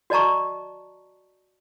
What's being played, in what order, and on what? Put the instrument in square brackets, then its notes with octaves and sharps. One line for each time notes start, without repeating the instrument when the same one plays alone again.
[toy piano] F#4 D5 D#5 A5 A#5 C#6